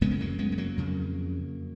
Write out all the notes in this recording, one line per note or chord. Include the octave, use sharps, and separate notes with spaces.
F#2 C#3 G#3 B3
G#3
F#3 A#3
G#3 B3
G#3
F#3 A#3
F2 C#3